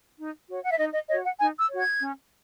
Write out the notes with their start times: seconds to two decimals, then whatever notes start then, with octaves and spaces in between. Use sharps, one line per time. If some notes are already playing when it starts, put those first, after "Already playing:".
0.18 D#4
0.48 F#4 C#5
0.63 F#5
0.71 E5
0.78 D#4 D#5
0.94 D#5
1.09 F#4 C#5 D#5
1.24 F#5
1.40 D#4 G#5
1.60 E6
1.69 F#4 C#5
1.80 G#6
2.00 C#4